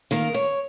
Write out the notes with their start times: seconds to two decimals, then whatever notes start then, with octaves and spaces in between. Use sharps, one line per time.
0.11 D#3 A#3 A#4
0.34 C#5